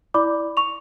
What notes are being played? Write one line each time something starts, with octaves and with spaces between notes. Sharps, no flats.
E4 D5 B5 D6
C#6 F7